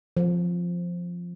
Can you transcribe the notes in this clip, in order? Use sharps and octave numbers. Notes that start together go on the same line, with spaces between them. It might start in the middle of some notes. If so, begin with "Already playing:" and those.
F3